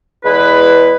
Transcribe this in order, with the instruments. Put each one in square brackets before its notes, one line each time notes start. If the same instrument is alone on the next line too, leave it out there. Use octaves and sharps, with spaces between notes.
[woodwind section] E2 G#3 E4 B4